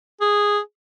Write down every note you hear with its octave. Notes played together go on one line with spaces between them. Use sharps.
G#4